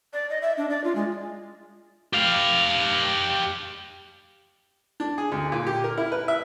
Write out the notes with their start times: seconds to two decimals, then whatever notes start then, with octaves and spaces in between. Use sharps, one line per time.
0.13 D5
0.30 D#5
0.42 E5
0.58 D4
0.70 D5
0.84 F4
0.96 G#3
2.13 G4 F5
5.00 D4
5.18 G#4
5.32 D2
5.52 A#2
5.67 G4
5.84 A#4
5.98 E4
6.12 B4
6.28 E5